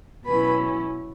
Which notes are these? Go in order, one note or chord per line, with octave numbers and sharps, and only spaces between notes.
B2 F#3 C#4 E4 B4 B5